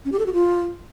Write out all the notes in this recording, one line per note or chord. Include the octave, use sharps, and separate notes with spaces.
C#4
G4
A4
F#4
F4